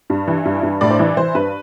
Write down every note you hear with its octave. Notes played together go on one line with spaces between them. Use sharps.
G2
E3
G2
G2
A2 D5
C5
E3 D5
E3 C5
G2 B4